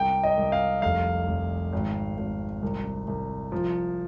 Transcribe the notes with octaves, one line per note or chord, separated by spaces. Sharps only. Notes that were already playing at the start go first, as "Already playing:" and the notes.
Already playing: C2 G5
D#5
C2
F5
F1 F5
F1
G#1
G#1
C2
C2
F3